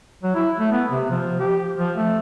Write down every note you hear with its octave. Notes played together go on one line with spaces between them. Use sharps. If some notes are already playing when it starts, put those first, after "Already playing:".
F#3
E4
A3
B3
C3
F3
G4
F3
A3